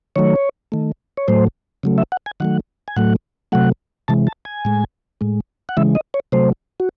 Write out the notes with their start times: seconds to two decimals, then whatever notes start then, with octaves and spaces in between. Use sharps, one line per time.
0.16 D#3 F#3 A3 C#5
0.72 D#3 A3
1.17 C#5
1.28 A2 F#3 A3 C5
1.83 C#3 F#3 A3
1.98 E5
2.12 F#5
2.26 G#5
2.40 D#3 F#3 A3 F#5
2.88 G#5
2.96 A2 F#3 A3 F#5
3.52 C3 F#3 A3 F#5
4.08 C3 E3 G#3 A5
4.27 A5
4.45 G#5
4.65 A2 G#3
5.21 A2 G#3
5.69 F#5
5.77 C#3 E3 G#3 E5
5.95 D#5
6.14 C#5
6.32 C3 F#3 A3 C5
6.80 F#4